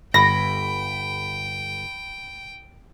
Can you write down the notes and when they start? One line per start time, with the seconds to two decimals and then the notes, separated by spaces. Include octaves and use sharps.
0.14 G1 G5 B5 A#6